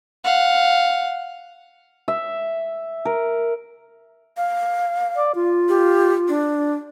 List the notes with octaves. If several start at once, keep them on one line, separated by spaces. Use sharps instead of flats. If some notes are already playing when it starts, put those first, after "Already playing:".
F5 F#5
E5
A#4
F5
D5
F4
G4
D4